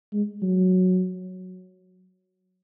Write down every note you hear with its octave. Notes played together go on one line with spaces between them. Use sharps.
G#3
F#3